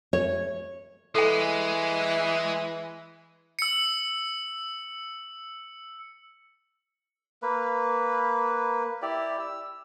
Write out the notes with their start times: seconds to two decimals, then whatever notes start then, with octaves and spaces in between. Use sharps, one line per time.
0.13 C#5
1.15 E3 G#3 A4 G#5
3.59 E6 C#7
7.42 A#3 B4
9.02 E4 G4 D5
9.39 E6